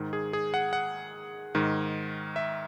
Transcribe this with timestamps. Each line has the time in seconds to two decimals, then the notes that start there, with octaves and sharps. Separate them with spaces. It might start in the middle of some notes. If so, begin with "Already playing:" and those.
Already playing: G#2 D#3
0.13 G#4
0.33 G#4
0.54 F#5
0.73 F#5
1.55 G#2 D#3
2.36 E5